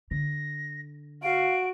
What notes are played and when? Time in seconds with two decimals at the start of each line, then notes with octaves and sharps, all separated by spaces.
0.11 D3 A#6
1.23 F#4 F5 D7